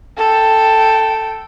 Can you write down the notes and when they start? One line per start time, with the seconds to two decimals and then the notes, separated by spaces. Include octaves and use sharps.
0.17 A4 G5